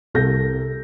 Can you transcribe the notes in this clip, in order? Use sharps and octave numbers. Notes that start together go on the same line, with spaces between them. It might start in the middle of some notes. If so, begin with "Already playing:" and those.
C2 A4 G6 A#6